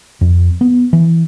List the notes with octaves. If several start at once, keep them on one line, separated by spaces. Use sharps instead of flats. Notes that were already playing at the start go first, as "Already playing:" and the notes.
F2
B3
E3